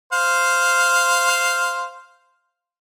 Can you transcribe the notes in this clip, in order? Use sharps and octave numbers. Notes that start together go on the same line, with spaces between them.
C5 F5